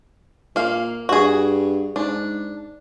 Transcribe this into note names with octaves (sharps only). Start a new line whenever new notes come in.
A#2 A#3 F5
G2 F#4 G#4
G#2 D4